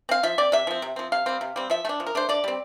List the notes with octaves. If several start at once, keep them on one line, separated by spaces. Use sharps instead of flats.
C4 F5
F3 E5
C4 D5
C3 E5
F3 C4
C3
F3 C4
C3 F5
G3 C4
C3
G3 C4
F3 E5
A3
D4
F3
A#4
A3 D4 C5
D3 D5
G3 C4